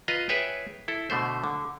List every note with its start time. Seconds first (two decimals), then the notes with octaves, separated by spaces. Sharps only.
0.08 F4 B4 D#5 A#5
0.29 G#4 B4 C#5 E5 G5
0.88 E4 A4
1.10 B2 D3 A3 C5
1.44 D3